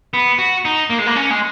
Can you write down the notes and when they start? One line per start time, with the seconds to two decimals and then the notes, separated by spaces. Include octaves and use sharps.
0.14 B3
0.39 F#4
0.65 D#4
0.90 A#3
0.99 G#3
1.06 A#3
1.16 C#4
1.31 G#3